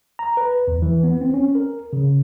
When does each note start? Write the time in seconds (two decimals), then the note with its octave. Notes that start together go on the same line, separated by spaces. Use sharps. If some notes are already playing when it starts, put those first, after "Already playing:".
0.19 A#5
0.37 B4
0.67 E2
0.82 E3
1.04 B3
1.21 C4
1.34 C#4
1.55 A#4
1.93 C#3